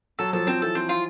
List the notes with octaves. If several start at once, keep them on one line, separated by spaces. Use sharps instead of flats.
F#3 A4
F3 A4
F3 C4
E3 A4
C4
F4